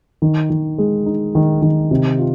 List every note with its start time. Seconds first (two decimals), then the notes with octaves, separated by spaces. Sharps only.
0.22 D#3
0.50 D#3
0.78 G#3
1.06 D#4
1.35 D#3
1.62 D#3
1.91 C3
2.19 F4